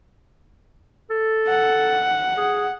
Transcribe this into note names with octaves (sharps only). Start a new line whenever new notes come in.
A4
F#5
G#4